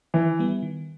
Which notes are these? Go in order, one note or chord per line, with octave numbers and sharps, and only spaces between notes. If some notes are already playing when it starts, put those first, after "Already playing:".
D#3 E3
G3 B3
D#3